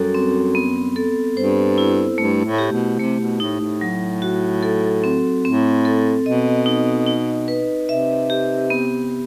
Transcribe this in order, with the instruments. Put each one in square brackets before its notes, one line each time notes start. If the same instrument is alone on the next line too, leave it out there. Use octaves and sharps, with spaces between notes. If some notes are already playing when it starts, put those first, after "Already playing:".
Already playing: [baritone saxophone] F#2 [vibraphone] G3 F#4 A4
[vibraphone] C4
B3
A4
[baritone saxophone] G2 [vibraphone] C5
[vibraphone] E4
[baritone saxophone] G2 [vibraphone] A3
[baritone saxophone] A2
[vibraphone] G4
[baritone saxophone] B2
[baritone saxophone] C3 [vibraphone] A3
[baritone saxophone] B2
[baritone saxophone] A2 [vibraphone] D#4
[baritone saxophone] A2
[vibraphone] F#3
F#4
A4
C4
[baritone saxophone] A2 [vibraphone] C4
[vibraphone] A4
[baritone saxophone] B2 [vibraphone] D#5
[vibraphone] D#4
D#4
B4
[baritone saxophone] C3 [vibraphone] E5
[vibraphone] G4
B3